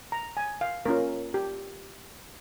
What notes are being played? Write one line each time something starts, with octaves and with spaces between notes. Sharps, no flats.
A#5
G#5
F5
A#3 C#4 F4 A#4
G4